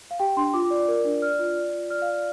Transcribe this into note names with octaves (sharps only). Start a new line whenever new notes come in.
F5
G4 G5
D4 C6
F4 D6
D5
A#4
D4
D5 F6
F4
D5
F4
D5 F6
F5
D5